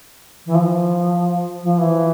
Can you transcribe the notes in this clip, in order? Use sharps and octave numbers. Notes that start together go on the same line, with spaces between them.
E3
F3
F3
E3